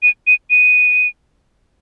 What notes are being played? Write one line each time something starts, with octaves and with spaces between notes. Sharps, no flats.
D#7
D#7
D#7